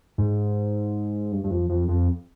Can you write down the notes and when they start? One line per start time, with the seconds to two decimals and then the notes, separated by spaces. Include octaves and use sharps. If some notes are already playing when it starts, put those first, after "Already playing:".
0.18 G#2
1.32 G2
1.44 G2
1.50 F2
1.69 F2
1.88 F2